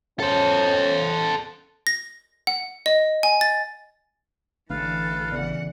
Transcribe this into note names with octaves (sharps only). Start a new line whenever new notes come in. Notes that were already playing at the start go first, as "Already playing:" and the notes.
C#4 A4 C5
A#6
F#5
D#5
G#5
A6
A1 D3 E3 A3 D4 A4 B4 F5
C#3 E3 B3 D5 F#5